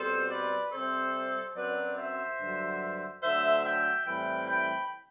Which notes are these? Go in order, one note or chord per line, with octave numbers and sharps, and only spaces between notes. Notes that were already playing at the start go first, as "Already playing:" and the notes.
Already playing: B2 G3 C4 A4 C5
B4 D5
C3 G3 C4 A4 C5
F#2 F#3 C4 B4 D5
C5 E5
G2 D3 F#3
D3 F#3 A3 C5 E5
E5 G5
A2 E3 G3 C4 G5 B5
G5 B5